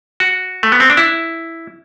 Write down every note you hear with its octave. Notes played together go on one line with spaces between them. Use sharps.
F#4
A3
B3
C4
D4
E4